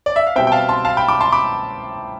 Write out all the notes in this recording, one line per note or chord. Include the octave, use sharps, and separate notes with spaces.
D5
E5
F5
B2 G3 C4 E5 G5
G5
F5 A5
A5 C6
F5 A5
G5 B5
B5 D6
A5 C6
B5 D6